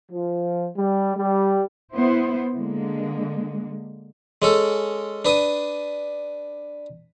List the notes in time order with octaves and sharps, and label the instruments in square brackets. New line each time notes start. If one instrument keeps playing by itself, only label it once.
[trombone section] F3
G3
G3
[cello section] B3 E4 C5
D3 G#3 A#3
[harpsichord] G#3 C#4 A4
D4 B4 D#6